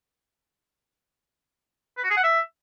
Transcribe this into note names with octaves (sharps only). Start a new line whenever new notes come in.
B4
F#4
G#4
F#5
E5